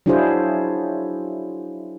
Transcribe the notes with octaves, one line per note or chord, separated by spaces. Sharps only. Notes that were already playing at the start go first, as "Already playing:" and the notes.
F#3 D4 E4 F4 G#4 C5